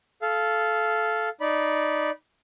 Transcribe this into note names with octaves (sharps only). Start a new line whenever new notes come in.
A4 F5
D#4 D5 B5